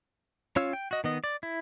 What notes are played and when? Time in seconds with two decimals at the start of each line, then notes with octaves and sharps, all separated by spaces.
0.56 C#4 F4 C#5 F5 E6
0.73 G5
0.91 F#4 D#5
1.04 D#3 B3 D#5
1.24 D5
1.43 E4